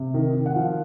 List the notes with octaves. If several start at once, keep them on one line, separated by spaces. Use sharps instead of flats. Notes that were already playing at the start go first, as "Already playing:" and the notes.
Already playing: C3
D#3
D#3
F#5
F3 F5